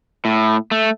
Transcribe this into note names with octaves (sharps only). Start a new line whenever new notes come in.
A2
A3